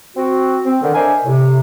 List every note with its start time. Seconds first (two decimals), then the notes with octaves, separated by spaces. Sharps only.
0.17 C4 F#4
0.65 C4
0.82 D3 D#3
0.94 D4 A#4 C5 D#5 E5 G#5
1.25 A2 C3